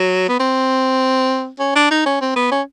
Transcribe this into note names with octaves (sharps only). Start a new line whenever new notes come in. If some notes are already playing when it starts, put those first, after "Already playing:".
Already playing: F#3
B3
C4
C#4
D4
D#4
C#4
C4
B3
C#4